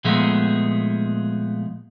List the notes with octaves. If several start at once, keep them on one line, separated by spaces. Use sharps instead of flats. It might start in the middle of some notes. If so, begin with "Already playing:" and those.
A#2 F3 G#3 A3 B3